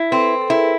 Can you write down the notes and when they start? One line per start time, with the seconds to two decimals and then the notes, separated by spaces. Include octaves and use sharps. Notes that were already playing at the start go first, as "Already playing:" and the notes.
Already playing: E4
0.11 C4 A4 B4
0.41 A4
0.49 E4 G#4 A#4